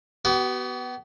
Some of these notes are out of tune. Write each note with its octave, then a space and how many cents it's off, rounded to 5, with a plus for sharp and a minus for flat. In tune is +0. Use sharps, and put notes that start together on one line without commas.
B3 +0 F#4 +45